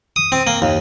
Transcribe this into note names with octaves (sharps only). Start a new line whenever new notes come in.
D#6
C4
A#3
D#2